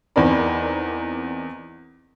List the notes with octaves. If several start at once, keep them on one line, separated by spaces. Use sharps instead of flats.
E2 C4 D#4 A#4 D5 B5